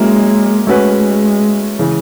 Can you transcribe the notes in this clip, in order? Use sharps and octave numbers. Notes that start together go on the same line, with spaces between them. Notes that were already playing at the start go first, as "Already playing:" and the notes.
Already playing: F#3 G#3 A#3 C#4 E4
G#3 A3 C#4 F#4 B4
C#3 E3